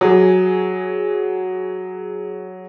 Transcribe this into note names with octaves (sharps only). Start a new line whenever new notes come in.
F#3 F#4 G#4